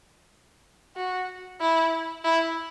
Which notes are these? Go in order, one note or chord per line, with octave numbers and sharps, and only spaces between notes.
F#4
E4
E4